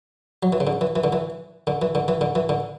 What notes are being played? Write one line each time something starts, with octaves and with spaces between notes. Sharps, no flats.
F#3
E3
C#3
D3
E3
E3
D3
E3
D3
E3
D3
E3
D3
E3
D3